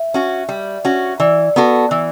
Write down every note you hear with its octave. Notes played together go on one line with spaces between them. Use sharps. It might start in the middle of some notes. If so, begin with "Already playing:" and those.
Already playing: E5
C#4 F#4
G3
C#4 F#4
E3 D5
B3 F#4 A4
E3